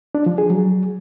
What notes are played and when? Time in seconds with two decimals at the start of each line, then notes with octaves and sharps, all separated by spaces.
0.15 D4
0.26 F3
0.38 G#4
0.50 F#3